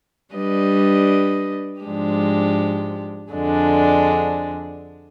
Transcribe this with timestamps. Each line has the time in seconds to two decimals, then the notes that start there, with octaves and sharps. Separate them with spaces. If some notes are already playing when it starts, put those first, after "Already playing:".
0.33 G3 D4 G4 B4 D#5
1.82 G#2 F3 G#3 D4 G4
3.33 F2 D3 G#3 D4